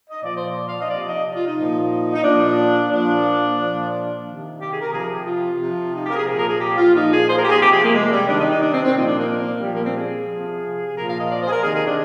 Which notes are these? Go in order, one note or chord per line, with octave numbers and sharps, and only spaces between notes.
D#5
A#2 F3 D5
C5
D5
F5
D#5
C3 F3 D5
D#5
F4
D#4
A#2 F3
D#4
A#2 F3 D4
A#2 F3 D4
A#2 F3
C3 D#3
G4
G#4
A#4
C3 F3 G#4
G4
F4
C3 F3
D#4
G4
A#4
G#4
A#2 F3 G#4
A#4
G#4
G4
F4
A#2 F3 D#4
G#4
C5
A#4
G4
G#4
C3 F3 G4
G#4
A#3
G#3
G3
C3 D#3 D4
D#4
D#4
D4
C4
C4
A#2 F3 D#4
D4
A#3
A#2 F3 G3
A#3
C4
G#4
C3 F3
A#2 F3 A#4
F5
D#5
D5
C5
G#4
A#4
C3 D#3 G#4
G#4
D4